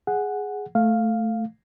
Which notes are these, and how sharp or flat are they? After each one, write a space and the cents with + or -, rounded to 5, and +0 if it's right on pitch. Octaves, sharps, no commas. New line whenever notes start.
G#4 +0 F#5 +0
A3 +0 F5 +0